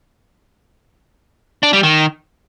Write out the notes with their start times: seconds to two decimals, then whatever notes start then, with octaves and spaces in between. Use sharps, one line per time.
1.63 D4
1.73 G3
1.83 D#3